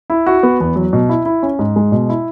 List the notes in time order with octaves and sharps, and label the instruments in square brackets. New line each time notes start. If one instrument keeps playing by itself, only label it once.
[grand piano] E4
F#4
B3
E2
F#3
B2
E4
E4
C#4
G#2
G#3
B2
E4